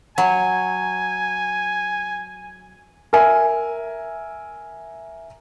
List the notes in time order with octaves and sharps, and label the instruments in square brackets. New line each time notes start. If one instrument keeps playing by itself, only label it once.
[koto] F#3 [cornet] G#5
[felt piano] A#4 E5 G#5